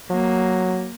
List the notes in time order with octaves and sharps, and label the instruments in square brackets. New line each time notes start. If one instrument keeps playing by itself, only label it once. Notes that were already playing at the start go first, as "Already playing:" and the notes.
[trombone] F#3 [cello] A#3